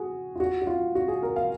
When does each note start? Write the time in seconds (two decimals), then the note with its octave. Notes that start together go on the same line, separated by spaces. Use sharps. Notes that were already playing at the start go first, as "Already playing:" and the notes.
Already playing: F#4 G#4
0.35 F4
0.40 F#4
0.62 F#4
0.67 F4
0.95 F#4
1.08 G#4
1.23 A#4
1.36 F5